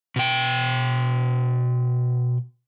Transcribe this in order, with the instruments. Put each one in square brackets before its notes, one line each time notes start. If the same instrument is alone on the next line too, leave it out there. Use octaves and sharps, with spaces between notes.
[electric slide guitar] B2 G5